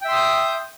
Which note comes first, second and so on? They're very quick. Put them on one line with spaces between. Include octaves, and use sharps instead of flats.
G5 E5 C6 D#6 G6